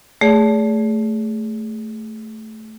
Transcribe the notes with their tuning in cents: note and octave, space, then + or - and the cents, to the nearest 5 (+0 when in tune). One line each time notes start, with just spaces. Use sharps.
A3 +0 G#4 -10 D5 -40